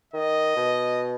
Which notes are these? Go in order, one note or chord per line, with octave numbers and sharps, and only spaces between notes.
D#3 D#5
B2